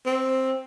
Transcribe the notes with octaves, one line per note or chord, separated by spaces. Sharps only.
C4